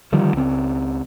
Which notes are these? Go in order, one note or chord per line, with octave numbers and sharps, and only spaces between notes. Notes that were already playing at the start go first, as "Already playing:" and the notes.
D3 D#3 F3 G3
C#2 C4